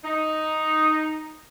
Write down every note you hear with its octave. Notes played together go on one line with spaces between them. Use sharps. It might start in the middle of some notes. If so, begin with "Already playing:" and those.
D#4